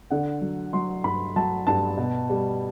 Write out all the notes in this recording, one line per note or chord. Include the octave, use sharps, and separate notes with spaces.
D3 F#5
F#3
F#3 C6
G2 B5
F#3 A5
G2 A5
B2
G3